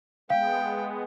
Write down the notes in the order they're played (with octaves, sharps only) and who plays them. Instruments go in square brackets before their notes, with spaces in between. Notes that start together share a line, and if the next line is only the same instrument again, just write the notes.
[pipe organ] G#3 B3 [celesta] F5 [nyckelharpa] G5